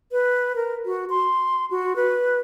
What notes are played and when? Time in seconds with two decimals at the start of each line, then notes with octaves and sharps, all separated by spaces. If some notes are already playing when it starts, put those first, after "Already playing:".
0.12 B4
0.56 A#4
0.86 F#4
1.10 C6
1.71 F#4
1.96 B4